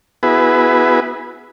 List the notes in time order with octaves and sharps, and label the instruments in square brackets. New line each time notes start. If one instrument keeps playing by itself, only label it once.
[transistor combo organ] B3 E4 F#4 G#4 B4